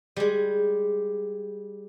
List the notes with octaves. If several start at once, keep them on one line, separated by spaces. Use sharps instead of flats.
G3 G#3